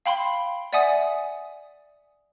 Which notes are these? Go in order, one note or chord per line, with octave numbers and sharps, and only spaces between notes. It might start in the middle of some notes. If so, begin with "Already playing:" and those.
F5 G5 B5 C6
D5 E5 F#5 G#5 D#6